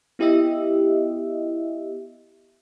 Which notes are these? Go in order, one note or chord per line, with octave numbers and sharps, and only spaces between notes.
B3 E4 G4 D#5 E5